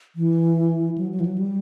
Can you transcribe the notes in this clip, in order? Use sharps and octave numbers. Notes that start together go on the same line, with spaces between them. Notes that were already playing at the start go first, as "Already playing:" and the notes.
E3
F#3
F#3
E3
F#3
G3